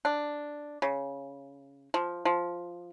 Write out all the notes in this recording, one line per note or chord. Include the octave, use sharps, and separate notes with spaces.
D4
C#3
F3
F3